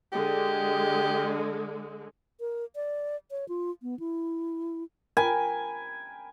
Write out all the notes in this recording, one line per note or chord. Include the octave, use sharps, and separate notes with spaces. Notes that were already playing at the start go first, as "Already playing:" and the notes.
D3 G#3 G4
A#4
D5
C#5
F4
B3
E4
A#4 G5 G#5 B5